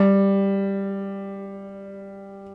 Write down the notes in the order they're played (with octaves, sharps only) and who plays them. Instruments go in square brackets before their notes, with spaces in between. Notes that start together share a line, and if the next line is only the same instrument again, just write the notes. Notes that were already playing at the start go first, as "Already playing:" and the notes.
Already playing: [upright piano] G3